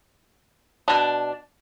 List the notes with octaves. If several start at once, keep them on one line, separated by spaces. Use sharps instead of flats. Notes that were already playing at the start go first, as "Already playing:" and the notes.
B2 D4